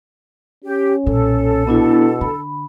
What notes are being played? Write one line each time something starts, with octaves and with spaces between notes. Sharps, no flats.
C#4 G4
B1 A#2 A4
B2 B3 D4 E4
D3 B5